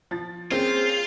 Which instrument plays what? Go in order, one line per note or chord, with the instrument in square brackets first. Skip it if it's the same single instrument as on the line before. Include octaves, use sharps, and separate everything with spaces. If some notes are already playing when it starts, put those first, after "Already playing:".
[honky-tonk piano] F3 A6
[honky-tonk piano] A#3 C4 C#4 [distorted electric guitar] F4 [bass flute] G#4 [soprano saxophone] C5